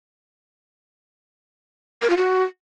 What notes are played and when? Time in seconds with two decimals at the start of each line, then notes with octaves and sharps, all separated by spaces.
2.02 A#4
2.10 F4
2.17 F#4